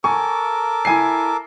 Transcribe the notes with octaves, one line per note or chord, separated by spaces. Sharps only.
A4 A#4 G#5 C#6 D6
E4 G#5 C7